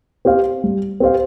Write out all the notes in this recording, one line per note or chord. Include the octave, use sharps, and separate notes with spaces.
C4 G4 C5 F5
G3
C4 G4 C5 F5